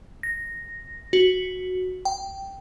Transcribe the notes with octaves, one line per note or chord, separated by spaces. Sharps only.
A#6
F#4
G5